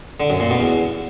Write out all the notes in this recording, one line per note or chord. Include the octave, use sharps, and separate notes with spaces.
D3
F#2
A#2
B2
E2